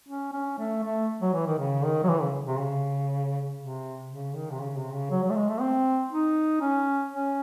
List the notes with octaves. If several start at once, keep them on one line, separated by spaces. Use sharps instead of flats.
C#4
C#4
A3
A3
F#3
E3
D#3
C#3
D#3
F#3
E3
C#3
C3
C#3
C3
C#3
D#3
C3
C#3
C3
C#3
F#3
F#3
A3
G#3
A3
C4
D#4
C#4
C#4